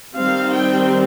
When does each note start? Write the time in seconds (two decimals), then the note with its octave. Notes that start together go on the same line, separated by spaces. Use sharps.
0.16 D#3 G3 C4 F5
0.53 G5